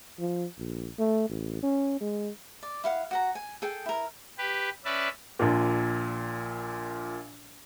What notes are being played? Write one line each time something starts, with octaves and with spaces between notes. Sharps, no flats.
F3
A#1
A3
A1
C#4
G#3
D5
E4 F5 F#5
F#4 F#5 A#5
G#5
G#4 A4 G5
E4 A#4
G4 B4
C#4 B4 D5 E5
A#1 A#2